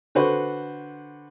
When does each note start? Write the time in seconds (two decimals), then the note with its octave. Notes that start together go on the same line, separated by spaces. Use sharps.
0.15 D3 F#4 B4 C5